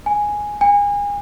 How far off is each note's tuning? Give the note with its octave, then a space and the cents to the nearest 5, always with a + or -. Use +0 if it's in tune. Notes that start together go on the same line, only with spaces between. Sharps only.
G#5 +0
G#5 -30